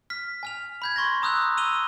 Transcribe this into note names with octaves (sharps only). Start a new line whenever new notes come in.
F6 B6
G#5 F6 F7
B5 G6 G#6
C6 C#6 G#6 A#6
A#5 D#6 E6 F#6 G6 F7
E6 D#7 F7 G7